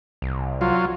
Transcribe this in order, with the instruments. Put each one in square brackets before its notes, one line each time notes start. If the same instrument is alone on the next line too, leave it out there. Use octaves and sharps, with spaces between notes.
[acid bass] C2
[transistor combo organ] F#3 F4